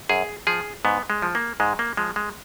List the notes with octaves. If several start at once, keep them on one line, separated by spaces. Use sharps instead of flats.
F#2 G#4
F3 G#4
G#2 B3
G#3
F3
A#3
G#2 G#3
A#3
F3 G#3
G#3